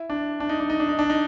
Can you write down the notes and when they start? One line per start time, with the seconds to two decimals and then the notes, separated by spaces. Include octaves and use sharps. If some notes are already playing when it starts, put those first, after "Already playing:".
Already playing: E4
0.10 D4
0.40 D4
0.49 D#4
0.60 D4
0.70 D#4
0.80 D4
0.89 D#4
0.99 D4
1.10 D#4